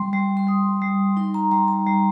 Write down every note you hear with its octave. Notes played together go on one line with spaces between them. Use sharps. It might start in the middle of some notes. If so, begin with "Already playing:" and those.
Already playing: G3 C6
G3
C6
G3 D#6
G3
D#4 C6
A#5
G3 A#5
A#5
G3